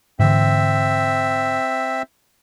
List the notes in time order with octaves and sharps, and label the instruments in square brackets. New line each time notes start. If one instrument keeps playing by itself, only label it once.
[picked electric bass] G#2 D3 E3 [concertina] C4 E5